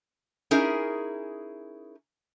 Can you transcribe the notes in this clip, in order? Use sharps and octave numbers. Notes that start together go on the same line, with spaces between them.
C#4 D#4 E4 G#4 A#4